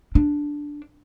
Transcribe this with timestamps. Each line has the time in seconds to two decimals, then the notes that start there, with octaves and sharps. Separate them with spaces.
0.15 D4